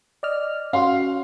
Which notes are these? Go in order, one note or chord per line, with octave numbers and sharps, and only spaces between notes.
D5 D#5 F6
C#4 F#4 F5 C6